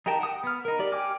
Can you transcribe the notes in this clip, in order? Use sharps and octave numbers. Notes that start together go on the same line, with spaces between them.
D#4 G4 A#4 G5 A5
F#5 D#6
B3 F6
D#4 A#4
G4 D5
G5 G#5 D6 F6